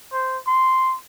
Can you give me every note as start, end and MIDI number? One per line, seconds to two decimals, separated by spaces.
0.13 0.37 72
0.47 0.95 84